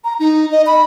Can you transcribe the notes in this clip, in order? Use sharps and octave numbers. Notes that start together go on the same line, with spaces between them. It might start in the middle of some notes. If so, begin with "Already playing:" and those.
A#5
D#4
D#5
B5